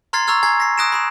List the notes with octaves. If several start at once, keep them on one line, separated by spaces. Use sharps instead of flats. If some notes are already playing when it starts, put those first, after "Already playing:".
A#5 C6 F6 G#6 A6 C7
A#5 C#6 E6 F6 G#6
G#5 A#5 G#6 C7
A#6 C7
D#6 F#6 A#6 D7 E7
B5 D#6 E7